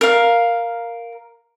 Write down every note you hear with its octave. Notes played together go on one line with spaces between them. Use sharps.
A#4 F5